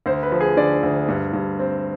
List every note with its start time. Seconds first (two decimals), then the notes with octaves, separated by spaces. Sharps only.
0.06 D2 C5
0.23 B4
0.32 F3
0.41 G#4
0.57 D3 D5
0.83 D2
1.08 G2
1.33 G2
1.59 C4